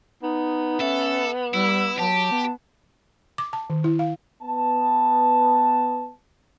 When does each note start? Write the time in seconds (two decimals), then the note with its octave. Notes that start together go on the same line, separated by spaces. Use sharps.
0.23 B3 D#4
0.80 C#4 A4 E5
1.54 G3 E4 E6
1.99 F#3 G4 A5
2.31 B3
3.38 D6
3.53 A5
3.70 D#3
3.84 E4
3.99 F5
4.42 B3 A5